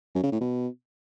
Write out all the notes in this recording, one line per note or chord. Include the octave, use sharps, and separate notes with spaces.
F#2
C#3
A2
B2